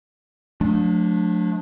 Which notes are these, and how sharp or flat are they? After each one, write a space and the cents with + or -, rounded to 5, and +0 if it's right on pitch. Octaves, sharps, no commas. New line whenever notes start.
F3 +45 A3 -25 D4 +0